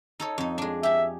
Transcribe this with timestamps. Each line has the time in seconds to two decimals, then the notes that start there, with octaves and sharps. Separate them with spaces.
0.20 D#4 A4 C#5
0.38 F2 D#4
0.58 G#3 D4
0.83 G4 G#4 E5